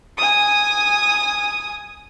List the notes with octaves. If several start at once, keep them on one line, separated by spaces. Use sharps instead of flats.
G#5 D#6